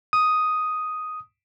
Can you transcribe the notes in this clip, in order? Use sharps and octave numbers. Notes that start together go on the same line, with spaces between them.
D#6